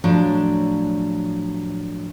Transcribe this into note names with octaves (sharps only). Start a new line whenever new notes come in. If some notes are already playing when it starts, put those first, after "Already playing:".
A2 F3 F#3 D4